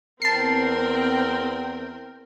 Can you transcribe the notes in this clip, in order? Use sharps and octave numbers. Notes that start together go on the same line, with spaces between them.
E2 C4 A#4 G5 A5 C7